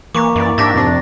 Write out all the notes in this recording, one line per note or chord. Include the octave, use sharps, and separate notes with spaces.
E3 A#3 A#5 C#6 D6
F#2 E3 D5
G#2 D4 G4 E5 A6 A#6
F2 C3 D4